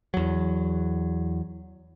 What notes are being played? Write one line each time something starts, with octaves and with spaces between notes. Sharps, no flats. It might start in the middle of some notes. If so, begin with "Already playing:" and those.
E2 F#3